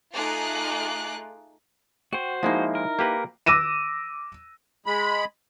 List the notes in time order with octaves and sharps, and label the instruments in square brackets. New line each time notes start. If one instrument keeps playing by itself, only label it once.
[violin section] A3 D#4 F4 G#4 D6 F#6
[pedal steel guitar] F#4 C5 [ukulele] G5
[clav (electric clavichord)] F3 G#3 A#3 [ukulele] D#4 E4
[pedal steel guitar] A#4
[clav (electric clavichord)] A#3 G4 B4
[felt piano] D6 E6 A#6 D#7 E7
[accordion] G#3 B5